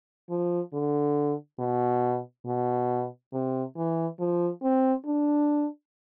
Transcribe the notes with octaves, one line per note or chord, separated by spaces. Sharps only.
F3
D3
B2
B2
C3
E3
F3
C4
D4